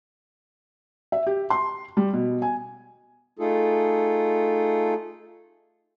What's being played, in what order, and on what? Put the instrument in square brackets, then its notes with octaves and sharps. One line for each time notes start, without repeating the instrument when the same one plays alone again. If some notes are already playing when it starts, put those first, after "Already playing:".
[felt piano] E5
G4
C6
G3
B2
G#5
[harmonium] A3 D#4 F4 G#4 A4